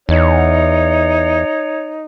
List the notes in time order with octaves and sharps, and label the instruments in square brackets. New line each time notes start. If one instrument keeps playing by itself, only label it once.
[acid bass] E2 [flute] D#4 [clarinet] C#5